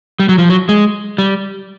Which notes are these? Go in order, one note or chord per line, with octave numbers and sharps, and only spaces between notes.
G3
F#3
F3
F#3
G#3
G3